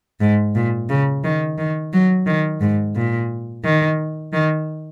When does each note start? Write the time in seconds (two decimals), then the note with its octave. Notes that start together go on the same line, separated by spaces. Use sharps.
0.21 G#2
0.55 A#2
0.89 C#3
1.24 D#3
1.58 D#3
1.93 F#3
2.27 D#3
2.61 G#2
2.95 A#2
3.64 D#3
4.33 D#3